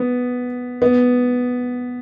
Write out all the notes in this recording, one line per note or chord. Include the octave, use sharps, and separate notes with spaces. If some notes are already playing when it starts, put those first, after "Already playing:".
Already playing: B3
B3